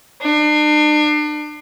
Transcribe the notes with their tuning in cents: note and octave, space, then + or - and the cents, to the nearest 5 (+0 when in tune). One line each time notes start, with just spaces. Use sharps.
D4 +35